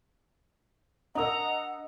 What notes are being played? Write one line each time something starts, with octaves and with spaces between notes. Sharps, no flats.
D4 A#4 D#5 F#5 A#5 D#6 E6